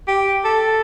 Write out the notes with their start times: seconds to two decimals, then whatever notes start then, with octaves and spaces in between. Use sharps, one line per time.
0.08 G4
0.44 A4